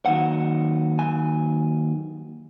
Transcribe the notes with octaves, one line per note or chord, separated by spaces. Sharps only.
D#2 D#3 F#3 F#5
G#5